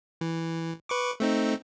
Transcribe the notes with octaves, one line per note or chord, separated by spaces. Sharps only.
E3
B4 C#6 D6
A3 C4 D#4